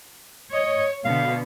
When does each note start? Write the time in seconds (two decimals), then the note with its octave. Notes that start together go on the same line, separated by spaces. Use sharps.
0.53 C#5 D#5
1.05 B2 D3 B3 F5